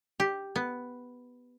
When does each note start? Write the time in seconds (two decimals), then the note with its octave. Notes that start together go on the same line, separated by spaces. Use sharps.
0.20 G4
0.56 B3